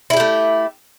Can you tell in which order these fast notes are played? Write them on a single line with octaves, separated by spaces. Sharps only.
E4 G#4 G4 A3